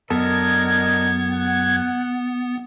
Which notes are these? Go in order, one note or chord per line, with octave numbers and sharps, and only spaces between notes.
F#2 B3 D4 A4 A#4 D#5 G#6
F#5